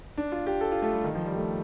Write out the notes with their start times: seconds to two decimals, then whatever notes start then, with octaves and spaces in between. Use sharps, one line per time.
0.17 D4
0.32 F4
0.47 G4
0.61 A4
0.72 F4
0.82 A3
0.93 G3
1.04 D#3
1.15 F3
1.26 G3
1.36 A3